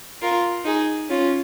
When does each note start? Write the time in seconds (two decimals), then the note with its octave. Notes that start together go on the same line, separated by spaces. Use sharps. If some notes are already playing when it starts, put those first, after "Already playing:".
0.22 F4 A#4
0.65 D#4 G#4
1.09 C#4 F4